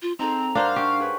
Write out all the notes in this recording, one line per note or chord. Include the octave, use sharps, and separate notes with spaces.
F4
C4 D#4 G#4 A4 A#5
G2 D4 A#4 C5 F5 F#5
D4 G4 C#6
G#4 B4 C#5